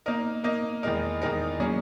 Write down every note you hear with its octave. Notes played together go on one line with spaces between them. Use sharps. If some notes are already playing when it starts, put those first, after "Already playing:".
A#3 D#4 A#4 D#5
A#3 D#4 A#4 D#5
E2 D#3 G#3 D#4 A#4
E2 D#3 G#3 D#4 A#4
F#3 A#3 C#4 G#4